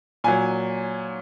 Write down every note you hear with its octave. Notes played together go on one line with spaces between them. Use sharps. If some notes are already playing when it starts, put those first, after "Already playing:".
A#2 F#3 G#5